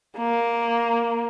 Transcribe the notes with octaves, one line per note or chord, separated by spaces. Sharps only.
A#3